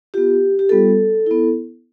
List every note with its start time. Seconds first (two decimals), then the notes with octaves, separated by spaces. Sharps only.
0.14 B3 F4 G4
0.59 G4
0.69 G3 B3 F4 A4
1.26 B3 E4